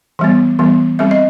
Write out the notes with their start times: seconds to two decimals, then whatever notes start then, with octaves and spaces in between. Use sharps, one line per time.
0.19 E3 G3 B3
0.59 E3 G3 B3
0.99 G3 C4 E5
1.11 D#5